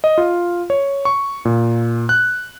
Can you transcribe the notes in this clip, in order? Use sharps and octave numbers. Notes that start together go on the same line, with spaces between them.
D#5
F4
C#5
C#6
A#2
F#6